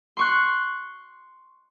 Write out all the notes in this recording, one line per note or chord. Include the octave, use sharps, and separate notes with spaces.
C6 C#6 F#6